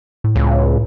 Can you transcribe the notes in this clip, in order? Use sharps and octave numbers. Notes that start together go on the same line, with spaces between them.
A2
C#2